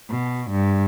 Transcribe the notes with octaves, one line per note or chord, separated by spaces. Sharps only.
B2
G2